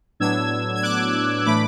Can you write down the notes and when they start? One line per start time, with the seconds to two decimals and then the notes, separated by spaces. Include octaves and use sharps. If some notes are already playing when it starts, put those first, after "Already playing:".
0.20 A2 F#3 B3 D4 E6 G#6
0.75 G#6
0.83 D6 F#6
1.45 A2 E3 A3 D4 B5 D6